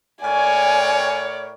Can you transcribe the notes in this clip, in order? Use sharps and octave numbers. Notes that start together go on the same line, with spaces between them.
A2 A#4 C#5 D5 G#5